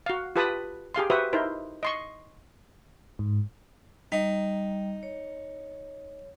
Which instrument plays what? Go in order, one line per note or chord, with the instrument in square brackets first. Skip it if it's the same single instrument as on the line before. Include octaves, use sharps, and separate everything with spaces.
[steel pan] F#4 F5
F4 G4 B4 A5 B5 D#6
G4 G#4 F5 C6
F#4 G4 B4 C5 E5 D#6
D#4 E4 A#4 C5
D#5 C6 C#6
[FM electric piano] G#2
[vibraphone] G3 [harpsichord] D#4
[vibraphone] C#5